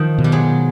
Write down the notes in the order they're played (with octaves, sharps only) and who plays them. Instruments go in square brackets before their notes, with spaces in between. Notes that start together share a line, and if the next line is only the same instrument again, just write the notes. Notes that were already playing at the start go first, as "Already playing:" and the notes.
Already playing: [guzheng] D#3 F3
[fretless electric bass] B2
[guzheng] G3
F#3 G#3